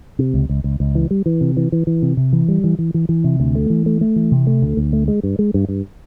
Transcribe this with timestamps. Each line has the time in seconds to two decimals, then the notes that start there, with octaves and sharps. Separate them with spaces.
0.19 C3
0.34 C#2
0.49 C#2
0.64 C#2
0.80 C#2
0.95 E3
1.11 G3
1.26 E3
1.41 C3
1.57 E3
1.72 E3
1.87 E3
2.02 C3
2.17 C3
2.33 E3
2.48 G3
2.64 E3
2.79 E3
2.94 E3
3.09 E3
3.24 C3
3.40 D2
3.55 A3
3.70 E3
3.86 A3
4.01 A3
4.16 E3
4.32 C3
4.47 A3
4.62 D2
4.77 D2
4.93 A3
5.08 G#3
5.23 G2
5.39 G#3
5.54 G2
5.68 G2